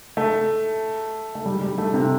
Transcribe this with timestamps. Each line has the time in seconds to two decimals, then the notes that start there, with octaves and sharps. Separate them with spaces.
0.17 A3
1.35 A3
1.45 G3
1.61 G3
1.78 A3
1.94 C3